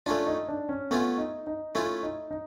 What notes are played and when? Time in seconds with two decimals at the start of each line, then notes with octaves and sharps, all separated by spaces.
0.06 A3 C#4 D4 F4
0.27 D#4
0.48 D4
0.69 C#4
0.91 A3 B3 C#4 F4
1.18 D#4
1.47 D#4
1.75 A3 C#4 E4 F4
2.03 D#4
2.31 D#4